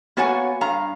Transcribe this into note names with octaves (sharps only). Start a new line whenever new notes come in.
A#3 B3 F#4 C#5 F#5 G#5
G2 F5 A#5